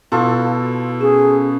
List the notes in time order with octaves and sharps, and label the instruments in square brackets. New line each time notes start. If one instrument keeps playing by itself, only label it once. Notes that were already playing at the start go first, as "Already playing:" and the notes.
[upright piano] B2 [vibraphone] E4 [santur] F4 A4
[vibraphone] C#4 [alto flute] G#4